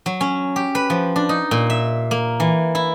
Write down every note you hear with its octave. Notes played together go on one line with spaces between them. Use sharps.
F#3
C#4
G4
B4
F3
D4
D#4
A#2
E5
A#3
E3
E4